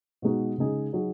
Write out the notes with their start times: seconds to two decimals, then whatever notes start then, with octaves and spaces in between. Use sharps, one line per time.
0.22 B2 G#3 D#4 F#4
0.58 C#3 G#3 D#4 G#4
0.93 F#3 D#4 G#4